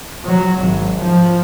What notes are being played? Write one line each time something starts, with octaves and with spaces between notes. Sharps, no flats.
F#3
G#1
F3